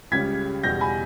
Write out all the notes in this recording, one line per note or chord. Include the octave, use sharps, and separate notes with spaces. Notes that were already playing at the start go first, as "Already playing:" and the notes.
C#2 C#3 G3 G#6 B6
E2 B2 G3 G6 A#6
G#5 B5